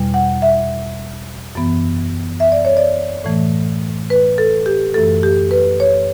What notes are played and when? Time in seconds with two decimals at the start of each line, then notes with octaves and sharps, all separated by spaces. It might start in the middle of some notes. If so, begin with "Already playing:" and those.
Already playing: E2 B2 G3
0.14 F#5
0.42 E5
1.55 F#2 E3 B3
2.40 E5
2.52 D5
2.65 C#5
2.77 D5
3.24 A2 E3 A3
4.10 B4
4.38 A4
4.66 G4
4.94 F#2 E3 A3 A4
5.23 G4
5.51 B4
5.80 C#5